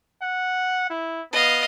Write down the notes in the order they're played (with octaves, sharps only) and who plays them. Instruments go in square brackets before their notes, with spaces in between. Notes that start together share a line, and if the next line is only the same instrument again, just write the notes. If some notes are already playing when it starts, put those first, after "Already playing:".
[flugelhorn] F#5
E4
[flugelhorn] B3 [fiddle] D#5 F5